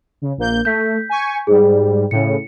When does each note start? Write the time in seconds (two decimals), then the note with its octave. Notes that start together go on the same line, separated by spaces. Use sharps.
0.22 C#3
0.37 A#1 A#3 G6
0.65 A3 G6 B6
1.09 G#5 C#6
1.47 G#2 G3 G#4
2.11 A2 C#3 C#7